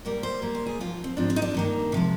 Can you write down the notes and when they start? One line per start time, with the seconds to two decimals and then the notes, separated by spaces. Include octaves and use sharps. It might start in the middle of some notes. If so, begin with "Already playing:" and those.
0.05 G#2 G3 A#3 A#4
0.23 C5
0.42 A#2 G3 A#3
0.55 C5
0.66 G#4
0.79 G#2 F3 C4 F4
1.04 C4
1.17 G#2 F3 G#3 C4 D4
1.30 C4
1.36 D#4
1.42 D4
1.54 G2 D#3 A#3
1.92 C3 F3 G#3